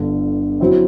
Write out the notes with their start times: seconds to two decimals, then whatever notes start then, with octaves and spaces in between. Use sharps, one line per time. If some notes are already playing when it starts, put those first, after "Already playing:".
Already playing: G1 G2 D3
0.60 F#3 C4 E4